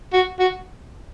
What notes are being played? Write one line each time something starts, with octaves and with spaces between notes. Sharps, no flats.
F#4
F#4